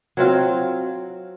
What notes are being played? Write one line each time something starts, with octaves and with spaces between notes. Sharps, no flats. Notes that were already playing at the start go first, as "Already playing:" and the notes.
F#3 C4 F4